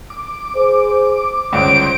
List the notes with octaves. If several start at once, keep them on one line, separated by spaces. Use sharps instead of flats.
D6
G#4 C5
G1 C#2 C5 C#5 D7